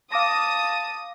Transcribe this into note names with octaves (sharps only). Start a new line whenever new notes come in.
F5 A5 D6 D#6 A#6